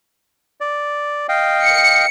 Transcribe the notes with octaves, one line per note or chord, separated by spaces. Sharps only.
D5
D#5 F5 G5
C#7